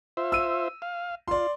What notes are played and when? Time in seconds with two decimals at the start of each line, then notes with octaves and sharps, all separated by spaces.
0.17 F4 C5 E5
0.32 E6 D#7
0.82 F5
1.28 F4 D5 C6